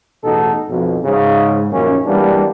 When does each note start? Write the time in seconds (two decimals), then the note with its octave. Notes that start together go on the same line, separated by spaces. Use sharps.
0.25 A1 E2 B2 B3 D#4 A4
0.70 B1 F2
1.04 G#2 C#3
1.72 A#1 F#2 D#3 A#3 C#4
2.06 E3 G3 G#3 A#3 B3 D4